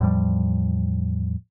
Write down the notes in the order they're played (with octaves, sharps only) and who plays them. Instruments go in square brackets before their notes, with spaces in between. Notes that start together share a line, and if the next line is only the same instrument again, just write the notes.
[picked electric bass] E2 A2 F3 G3